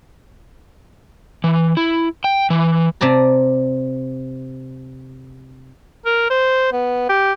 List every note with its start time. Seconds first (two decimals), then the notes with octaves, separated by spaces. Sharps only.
1.44 E3
1.77 E4
2.24 G5
2.50 E3
3.01 C3 D5 A5 A#5
6.06 A#4
6.30 C5
6.72 B3
7.09 G4